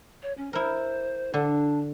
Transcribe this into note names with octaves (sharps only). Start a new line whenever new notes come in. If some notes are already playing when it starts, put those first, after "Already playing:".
C#5
C#4
E4 A#4 C5
D3 D4